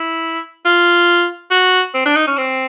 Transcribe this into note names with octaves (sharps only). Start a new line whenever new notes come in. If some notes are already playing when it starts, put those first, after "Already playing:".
Already playing: E4
F4
F#4
C4
D4
D#4
C#4
C4